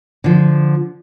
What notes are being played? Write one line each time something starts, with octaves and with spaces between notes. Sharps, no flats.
D3 F3